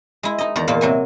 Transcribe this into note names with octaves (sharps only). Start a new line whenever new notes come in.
G#3 E4
D#4 D#5
E2 D#3 D5 A#5
E2 A#2 F4 C5
C3 F#3 G#5